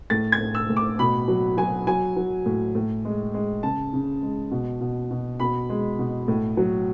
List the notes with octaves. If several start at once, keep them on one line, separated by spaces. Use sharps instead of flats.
A2 A6
G#6
A2
E6
A2
D6
B2 B5
F#3
F#3 G#5
F#3 G#5
F#3
A2
A2
G#3
G#3
C#3 A5
C#3
G#3
B2
B2
B2
B2 B5
G#3
B2
A2
F#3